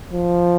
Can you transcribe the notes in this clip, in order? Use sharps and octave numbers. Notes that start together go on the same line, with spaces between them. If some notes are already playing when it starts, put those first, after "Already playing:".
F3